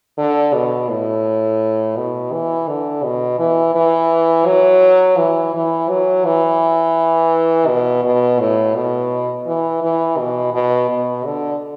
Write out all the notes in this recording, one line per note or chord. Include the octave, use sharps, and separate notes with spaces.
D3
B2
A2
B2
E3
D3
B2
E3
E3
F#3
E3
E3
F#3
E3
B2
B2
A2
B2
E3
E3
B2
B2
B2
D3